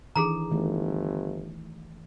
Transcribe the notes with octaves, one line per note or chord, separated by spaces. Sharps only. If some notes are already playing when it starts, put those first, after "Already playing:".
D#3 E3 D4 G#4 A4 A#5
G1 D#3 E3 A3